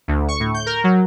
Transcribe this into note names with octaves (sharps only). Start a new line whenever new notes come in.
D2
C#6
A2
G6
A#4
F#3